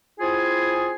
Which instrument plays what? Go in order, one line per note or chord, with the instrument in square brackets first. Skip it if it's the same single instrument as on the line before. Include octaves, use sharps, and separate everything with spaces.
[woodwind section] C4 E4 F4 G#4